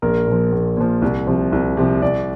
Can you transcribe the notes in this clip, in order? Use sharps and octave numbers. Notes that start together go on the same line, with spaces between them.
A#1 A#4
A#2 F3
A#1
A#2 F3
C2
C3 F3
C2
C3 F3
C2 D5